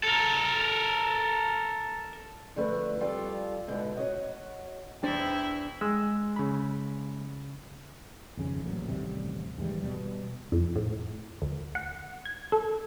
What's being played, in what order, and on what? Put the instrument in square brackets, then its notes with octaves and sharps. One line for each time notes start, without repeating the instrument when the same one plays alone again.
[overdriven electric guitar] A4 A#4
[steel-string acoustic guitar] D3 F3 A3 B4
F2 G3 F4 A4
G#2 B2 D3
F#4 C#5 D#5
[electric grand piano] E2 A6 [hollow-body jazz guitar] D4 C5 [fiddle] E4 [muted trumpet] G5
[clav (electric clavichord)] G#3 [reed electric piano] E6
[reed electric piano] C#3 B5
[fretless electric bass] G#1 F2 C#3
A1 A#2 F#3
A1 D#2 C3 G3
D#2 G#2 E3 G3
B2 G3
[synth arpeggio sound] F2
A2
D2
F#5
G#6
A4